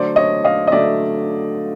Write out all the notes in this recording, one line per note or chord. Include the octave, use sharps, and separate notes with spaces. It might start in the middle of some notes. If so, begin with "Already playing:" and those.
Already playing: D3 F#3 A3 C5 D5
C#5 D#5
D#5 F5
D#5
D3 F#3 A3 D5 E5